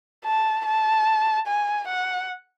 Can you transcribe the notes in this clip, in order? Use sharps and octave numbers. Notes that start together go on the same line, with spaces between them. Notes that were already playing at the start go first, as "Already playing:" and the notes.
A5
A5
G#5
F#5